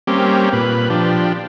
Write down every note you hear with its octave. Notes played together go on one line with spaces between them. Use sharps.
G3 A#3 C4 C#4 G4
A#2 B4
F3 D4 G4